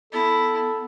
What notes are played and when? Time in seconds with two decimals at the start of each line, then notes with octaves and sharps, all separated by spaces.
0.13 B3 E4 A4